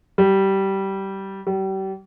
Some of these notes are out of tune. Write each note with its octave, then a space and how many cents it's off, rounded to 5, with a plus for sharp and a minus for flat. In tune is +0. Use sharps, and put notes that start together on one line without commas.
G3 -15
G3 -35